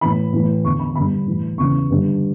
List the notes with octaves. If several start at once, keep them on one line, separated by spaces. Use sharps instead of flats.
A2 E3 B5
A2 E3
E2 D3 C#6
B5
G2 D3 B5
A2 E3
E2 C#3 E3 C#6
G2 D3